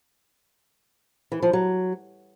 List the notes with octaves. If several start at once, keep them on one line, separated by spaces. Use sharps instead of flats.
E3
F3
F#3